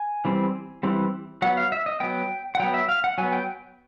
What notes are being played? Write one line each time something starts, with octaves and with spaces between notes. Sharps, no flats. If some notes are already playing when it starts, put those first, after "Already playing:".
Already playing: G#5
E3 G3 C4
E3 G3 C4
F#3 B3 F#5
F5
E5
D#5
F#3 B3 G5
F#5
F#3 B3 G5
E5
F5
F#5
F#3 B3 G#5
G5